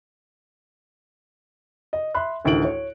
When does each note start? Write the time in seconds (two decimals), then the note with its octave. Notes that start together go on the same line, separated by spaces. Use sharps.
1.93 D#5
2.15 E5 B5 C6 F#6
2.45 A1 D2 D3 D#3 D7 F#7
2.65 C#5